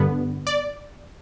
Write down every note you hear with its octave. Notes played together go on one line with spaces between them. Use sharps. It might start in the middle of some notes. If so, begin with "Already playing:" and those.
Already playing: G2 D3 B3
D5